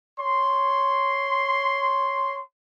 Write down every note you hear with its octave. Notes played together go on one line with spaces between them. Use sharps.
C#5 C6